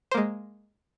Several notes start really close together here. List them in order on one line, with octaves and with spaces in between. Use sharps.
C5 A#3 G#3